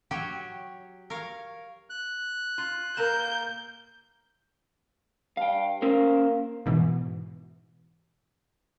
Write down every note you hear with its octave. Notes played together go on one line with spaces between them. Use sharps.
F#3 G4 C#5
A#4 C#5 F5
F#6
F4
A#2 A#3 A#4 A#5 G6 E7
G2 F5 G5
A#3 C#4 A#4 C5
G#2 B2 E3